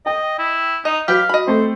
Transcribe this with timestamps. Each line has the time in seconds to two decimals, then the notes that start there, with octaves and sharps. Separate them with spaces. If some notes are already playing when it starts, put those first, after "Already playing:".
0.06 D#5 G5
0.39 E4
0.85 D#4 D#5
1.08 F#3 G4 B4 F5 G5
1.29 D#5 B5
1.47 A3 C4 C5